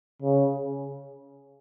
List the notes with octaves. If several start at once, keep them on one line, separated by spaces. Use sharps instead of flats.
C#3